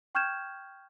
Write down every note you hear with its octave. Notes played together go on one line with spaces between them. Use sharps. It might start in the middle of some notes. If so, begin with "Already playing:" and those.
G5 C#6 F6 G6 G#6 E7